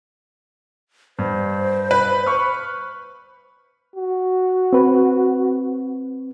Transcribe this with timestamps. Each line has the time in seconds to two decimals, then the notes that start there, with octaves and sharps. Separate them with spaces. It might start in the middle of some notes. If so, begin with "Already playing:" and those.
1.19 G2 C5
1.91 B4
2.27 C#6 F6
3.96 F#4
4.73 C4 B4